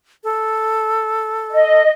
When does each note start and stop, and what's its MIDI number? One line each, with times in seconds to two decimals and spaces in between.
0.24 1.83 69
1.52 1.92 75